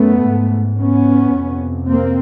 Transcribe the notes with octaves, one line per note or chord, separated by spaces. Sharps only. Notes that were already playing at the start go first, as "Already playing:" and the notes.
Already playing: F#2 C#3 A3 B3
G#2
B3 C#4
F2 C3
A#3 C4